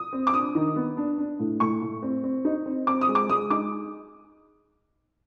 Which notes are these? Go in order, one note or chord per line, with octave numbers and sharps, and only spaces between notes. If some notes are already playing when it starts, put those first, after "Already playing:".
Already playing: D#6
C4
D6
D4 D#6
D#3
B3
D4
D4
A2
A2 C#6
A2
C4
C4
D#4
C4
C4 D6
D#6
G#3
D6
G#3 D#6
D#4 D6